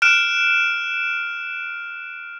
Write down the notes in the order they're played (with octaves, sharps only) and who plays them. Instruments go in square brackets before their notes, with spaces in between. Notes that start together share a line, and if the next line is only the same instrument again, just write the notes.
[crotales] F6 F#6 D7 E7